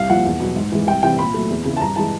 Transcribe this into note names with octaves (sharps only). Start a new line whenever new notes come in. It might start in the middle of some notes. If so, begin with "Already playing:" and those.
Already playing: C2 F5
A#2 F3 F#5
E2
B2 F#3
G#2
E3 G#3
C2 G5
C3 E3 G3 G5
A#2 B5
F#3 A3
E2
C#3 E3
A5
G2 A#5
E3 G#3 A5